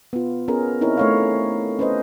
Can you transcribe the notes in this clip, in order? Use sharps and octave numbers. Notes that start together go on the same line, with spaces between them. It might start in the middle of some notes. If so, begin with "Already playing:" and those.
B3 F4
B3 C#4 G#4 A#4
C4 D#4 E4 A#4 C#5
A3 C#5 F5
C#4 B4 C5 D#5